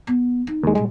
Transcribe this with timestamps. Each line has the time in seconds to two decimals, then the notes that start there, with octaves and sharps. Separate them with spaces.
0.07 B3
0.47 D#4
0.63 D#2 G#3
0.75 A#2 G3 G#3